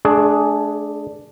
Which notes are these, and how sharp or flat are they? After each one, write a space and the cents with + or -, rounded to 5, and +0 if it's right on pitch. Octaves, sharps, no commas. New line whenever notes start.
A3 -35 D4 +0 G#4 +10